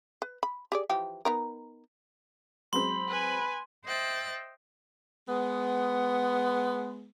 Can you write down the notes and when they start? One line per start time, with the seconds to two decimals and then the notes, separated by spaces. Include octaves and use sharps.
0.22 B4
0.43 B5
0.72 G4 G#4 D5
0.89 E3 F3 G4
1.25 B3 D#4 A#4
2.73 F#3 G#3 C4 B5 C6
3.09 B4 G#5
3.84 C5 D#5 E5 G5 F#6 A6
5.27 G#3 B3